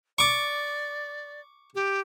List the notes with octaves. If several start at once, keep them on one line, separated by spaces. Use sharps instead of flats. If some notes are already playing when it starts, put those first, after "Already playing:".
D5 C#6 D6
G4